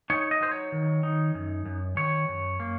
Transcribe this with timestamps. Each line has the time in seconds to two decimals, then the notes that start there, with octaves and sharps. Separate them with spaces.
0.10 D#4 C#5
0.31 D#5
0.41 F#3 C5
0.51 C#5
0.72 D#3
1.03 D#4
1.34 F#2
1.66 F#2
1.97 D#3 C#5
2.28 F#2
2.60 A#3